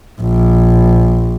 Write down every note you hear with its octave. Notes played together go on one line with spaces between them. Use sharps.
A#1